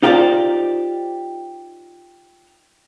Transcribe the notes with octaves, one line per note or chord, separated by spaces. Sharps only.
D#4 F4 G4 A#4 C5 D5